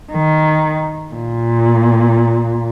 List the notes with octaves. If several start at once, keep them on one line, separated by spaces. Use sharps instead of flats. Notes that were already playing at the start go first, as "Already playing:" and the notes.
D#3
A#2